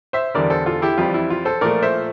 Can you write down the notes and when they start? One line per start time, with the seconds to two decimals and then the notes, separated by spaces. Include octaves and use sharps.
0.13 C5 E5
0.35 E2 D3 G3 A#4 D5
0.50 A4 C5
0.66 F4 A4
0.82 E4 G4
0.98 F2 E3 G3 F4
1.14 E4
1.30 F4
1.45 A4 C5
1.61 A#2 F3 A3 A#4 D5
1.82 C5 E5